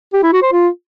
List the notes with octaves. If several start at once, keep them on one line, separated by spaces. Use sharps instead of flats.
G4
E4
F#4
C5
F4